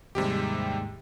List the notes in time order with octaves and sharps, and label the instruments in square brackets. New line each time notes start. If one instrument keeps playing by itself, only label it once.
[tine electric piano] D#2 G#2 G#3 [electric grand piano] C3 G3 G4